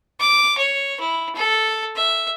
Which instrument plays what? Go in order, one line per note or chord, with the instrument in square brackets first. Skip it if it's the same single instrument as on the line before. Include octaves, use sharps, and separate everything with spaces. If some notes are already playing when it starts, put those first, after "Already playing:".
[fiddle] D6
C#5
E4
A4
E5